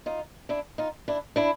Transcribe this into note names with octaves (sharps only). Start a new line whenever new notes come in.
D#4 F4
D4 E4
D#4 F4
D4 E4
D4 E4